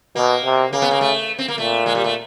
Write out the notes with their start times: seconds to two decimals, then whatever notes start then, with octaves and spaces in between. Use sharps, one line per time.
0.16 B2 A#3
0.44 C3
0.73 C#3 A#3
0.82 B3
0.91 A#3
1.01 A3
1.38 C4
1.48 A#3
1.58 A#2 A3
1.86 G#3
1.95 G3
2.04 A3